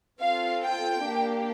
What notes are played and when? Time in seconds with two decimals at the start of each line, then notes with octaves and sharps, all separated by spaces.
0.21 C4 F4 A4 F5
0.63 G5
1.04 A#3 D4 G4